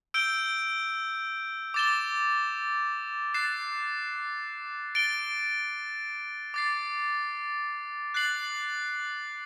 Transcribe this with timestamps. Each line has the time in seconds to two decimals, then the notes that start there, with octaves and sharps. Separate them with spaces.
0.14 E6 G6 D7 G7
1.74 D6 A6 E7 G7
3.34 F#6 A6 C7 E7
4.95 A6 D7 G7
6.54 D6 A6 C7
8.14 F#6 A6 C7 F#7